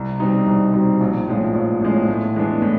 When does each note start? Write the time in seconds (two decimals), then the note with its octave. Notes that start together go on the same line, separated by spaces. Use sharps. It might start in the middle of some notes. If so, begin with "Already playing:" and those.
Already playing: C2
0.20 B2 G3 C4 D#4
0.47 C2
0.74 B2 G3 C4 D#4
1.01 A#1
1.28 A2 F3 G#3 C#4
1.55 A#1
1.81 A2 F3 G#3 C#4
2.09 A2
2.35 E3 G#3 B3 D4
2.62 A2